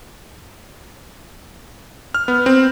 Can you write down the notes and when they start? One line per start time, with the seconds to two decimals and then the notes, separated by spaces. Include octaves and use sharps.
2.14 F6
2.28 B3
2.46 C4